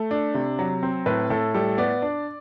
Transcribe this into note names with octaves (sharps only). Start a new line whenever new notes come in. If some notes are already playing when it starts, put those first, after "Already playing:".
Already playing: A3
D4
C3
F#3
C4
A2 B4
A2 A4
G3 A4
B3 D5
D4